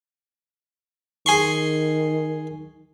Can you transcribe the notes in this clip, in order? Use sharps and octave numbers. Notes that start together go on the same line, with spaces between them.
D#3 G#4 C6 C#6